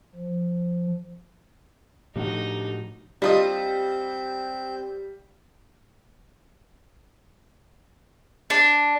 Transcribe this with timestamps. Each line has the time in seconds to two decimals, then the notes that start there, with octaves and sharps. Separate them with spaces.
0.15 F3
2.16 A2 F3 G3 A3 D4 D#4 F#4
3.22 G3 C4 D4 F4 D#5 G6
8.50 D4